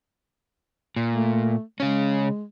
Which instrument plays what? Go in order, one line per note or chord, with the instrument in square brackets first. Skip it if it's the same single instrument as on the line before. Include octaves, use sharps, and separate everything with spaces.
[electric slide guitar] A#2
[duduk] A3
[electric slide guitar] C#3 C#4 [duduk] G#3